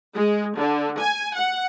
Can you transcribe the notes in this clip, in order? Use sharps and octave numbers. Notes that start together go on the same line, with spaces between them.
G#3
D3
G#5
F#5